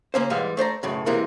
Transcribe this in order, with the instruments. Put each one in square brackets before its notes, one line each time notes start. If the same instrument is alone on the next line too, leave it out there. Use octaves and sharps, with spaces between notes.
[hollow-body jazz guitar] C#3 A#3 C#4 C5
G#2 E3 G3 G#3 G4 F5
A3 C5 D5 A#5
B1 F#2 A2 C#3
C3 E3 G#3 A#3 E4 A#4